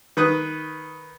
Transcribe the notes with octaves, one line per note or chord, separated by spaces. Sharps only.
D#3 B4 D#6 F#6